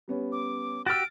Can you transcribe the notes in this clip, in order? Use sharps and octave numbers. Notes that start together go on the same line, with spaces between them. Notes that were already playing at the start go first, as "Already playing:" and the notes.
G3 B3 C#4
D6
F#4 G4 E6 F6 A6 D7